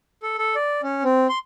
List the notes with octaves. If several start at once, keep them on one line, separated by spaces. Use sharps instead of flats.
A4
A4
D5
C#4
C4
C6